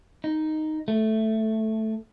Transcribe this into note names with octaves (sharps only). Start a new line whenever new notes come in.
D#4
A3